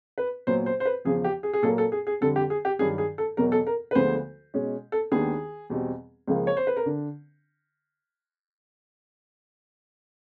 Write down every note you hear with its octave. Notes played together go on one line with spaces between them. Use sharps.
B4
A#2 F#3 B3 C5
C5
C5
B4
E2 C#3 F3 G#4
G4
G#4
G#4
A#2 F#3 A#3 A4
A4
G#4
G#4
F2 D3 G3 A4
G4
G#4
G4
G2 D#3 F#3 G#4
G#4
A4
E2 B2 F#3 A#4
A4
A#4
B4
D2 D3 F3 G#3 B3 C5
B2 G#3 C#4
A4
D#2 D#3 G#3 B3 D4 G#4
E2 B2 G3 C4
C#2 C#3 F3 A#3
C#5
C5
B4
A#4
D3 D4